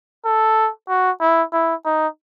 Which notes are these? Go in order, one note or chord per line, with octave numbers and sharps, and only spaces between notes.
A4
F#4
E4
E4
D#4